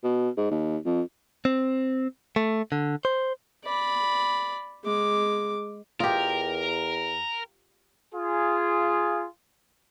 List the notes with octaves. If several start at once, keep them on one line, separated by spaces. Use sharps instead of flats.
B2
G#2
D#2
F2
C4
A3
D3
C5
D5 B5
G#3 D6
E2 F4 G4 A#4 D#5 G5
F4 G#4